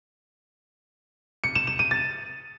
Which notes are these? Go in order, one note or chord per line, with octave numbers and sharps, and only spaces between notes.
C#7
E7
E7
D#7
A6